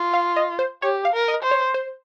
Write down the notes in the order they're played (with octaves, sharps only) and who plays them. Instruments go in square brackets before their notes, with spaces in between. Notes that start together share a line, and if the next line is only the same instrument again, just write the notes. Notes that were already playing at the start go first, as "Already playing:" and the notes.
Already playing: [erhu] F4
[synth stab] F5
D#5
C5
[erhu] G4 [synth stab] C#5
[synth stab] F5
[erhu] A#4
[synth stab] D#5
[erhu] C5
[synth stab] C#5
C5